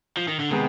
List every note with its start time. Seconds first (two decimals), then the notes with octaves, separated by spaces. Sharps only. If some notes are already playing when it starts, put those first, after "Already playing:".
0.17 F3
0.28 D#3
0.40 D3
0.50 C3 D#3 G#3 B3